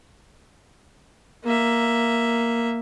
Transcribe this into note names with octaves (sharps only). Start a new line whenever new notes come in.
A#3 E5